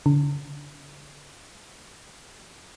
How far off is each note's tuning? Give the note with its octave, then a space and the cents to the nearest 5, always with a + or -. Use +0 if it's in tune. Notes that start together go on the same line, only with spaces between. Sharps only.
D3 -40